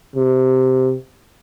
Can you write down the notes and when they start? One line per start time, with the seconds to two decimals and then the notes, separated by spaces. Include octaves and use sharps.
0.16 C3